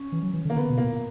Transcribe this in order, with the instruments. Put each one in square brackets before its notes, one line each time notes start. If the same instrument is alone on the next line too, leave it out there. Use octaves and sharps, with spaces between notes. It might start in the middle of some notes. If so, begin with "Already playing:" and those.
Already playing: [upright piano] C#4
[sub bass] E3
F#3
E3
D3
[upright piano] A#3
[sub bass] D3 [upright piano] B3
[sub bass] B2
[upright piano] A#3
[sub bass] A#2